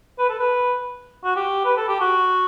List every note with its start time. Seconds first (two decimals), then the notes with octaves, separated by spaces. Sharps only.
0.19 B4
0.29 A4
0.39 B4
1.24 F#4
1.36 G4
1.65 B4
1.77 A4
1.88 G4
2.00 F#4